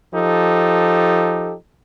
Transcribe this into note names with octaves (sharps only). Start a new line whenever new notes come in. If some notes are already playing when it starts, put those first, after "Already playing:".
F3 D#4 G4 A4